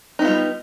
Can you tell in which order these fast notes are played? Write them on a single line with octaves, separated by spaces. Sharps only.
D#4 B3 F4 G3